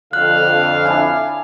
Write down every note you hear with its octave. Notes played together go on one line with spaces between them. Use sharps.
F2 D3 F5 F#6
D4 E4 G#5